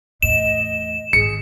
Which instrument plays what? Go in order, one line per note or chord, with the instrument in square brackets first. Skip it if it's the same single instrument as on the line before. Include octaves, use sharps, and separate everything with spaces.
[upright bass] E2 A2 [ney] D#5 [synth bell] E7
[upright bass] G#1 D#3 [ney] G#4 [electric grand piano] C#7